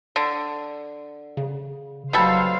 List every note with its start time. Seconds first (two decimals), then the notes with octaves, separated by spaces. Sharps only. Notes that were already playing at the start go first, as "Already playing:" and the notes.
0.16 D3
1.37 C#3
2.13 F#1 B2 F#3 G3 A4 C5 F5